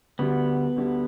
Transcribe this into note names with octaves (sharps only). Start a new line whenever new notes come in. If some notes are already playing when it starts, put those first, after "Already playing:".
D2 D3 G3 B3
D2 D3 G3